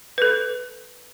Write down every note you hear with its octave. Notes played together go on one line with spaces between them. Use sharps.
A4 B4